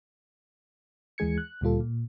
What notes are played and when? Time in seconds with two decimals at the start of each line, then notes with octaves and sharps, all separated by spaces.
1.18 D#2 E3 G#3 G#4 G#6 C#7
1.38 F#6
1.61 D2 A#2 G3 F4 A4
1.80 A#2